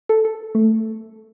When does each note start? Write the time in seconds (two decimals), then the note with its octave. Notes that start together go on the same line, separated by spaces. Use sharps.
0.09 A4
0.25 A4
0.55 A3